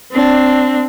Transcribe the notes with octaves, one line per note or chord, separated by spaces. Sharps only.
C4 D4